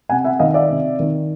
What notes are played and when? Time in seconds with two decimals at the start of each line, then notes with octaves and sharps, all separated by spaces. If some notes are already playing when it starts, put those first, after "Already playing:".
0.09 C3 F#5 G#5
0.24 E5 F#5
0.40 D#3 D#5 F5
0.54 D5 E5
0.70 C3
0.99 D#3